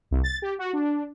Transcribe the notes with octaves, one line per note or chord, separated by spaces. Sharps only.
C2
A6
G4
F#4
D4